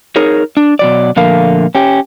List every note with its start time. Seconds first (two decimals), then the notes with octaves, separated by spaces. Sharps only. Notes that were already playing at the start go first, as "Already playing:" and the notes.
0.16 D#4 G#4 A#4 C#5
0.57 D4
0.79 B2 F#3 D5
1.16 A#2 D3 F3 A3 A#4 F5
1.75 C#4 G4